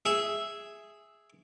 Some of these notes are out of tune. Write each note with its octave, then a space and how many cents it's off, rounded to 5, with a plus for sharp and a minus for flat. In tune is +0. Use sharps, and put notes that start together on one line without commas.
G#4 +0 E5 +0